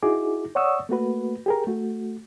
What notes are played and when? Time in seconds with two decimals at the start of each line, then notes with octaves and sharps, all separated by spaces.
0.03 D#4 E4 F#4 G#4 D6
0.55 C#5 D5 F#5 C#6 D#6 E6
0.89 A3 A#3 F#4 B4
1.46 G4 G#4 A#4
1.67 A3 F#4